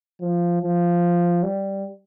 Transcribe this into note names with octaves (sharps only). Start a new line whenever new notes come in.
F3
F3
G3